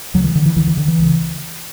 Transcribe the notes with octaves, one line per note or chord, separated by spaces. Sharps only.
D2 C#3 F#3
E3
D3
E3
D2 D3 E3
E3
D3
E3
C#2 C#3